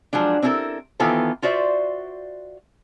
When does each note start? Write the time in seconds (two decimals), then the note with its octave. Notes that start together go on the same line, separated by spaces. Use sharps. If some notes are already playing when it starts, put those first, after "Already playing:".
0.13 F3 F#3 G#3 D4
0.42 C4 D4 E4 G4 A4 A#4
1.00 D#3 E3 B3 F4 A4 C5
1.42 F4 F#4 C5 D5 E5